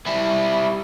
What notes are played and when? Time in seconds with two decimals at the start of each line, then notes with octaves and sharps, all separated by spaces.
0.06 G3 E4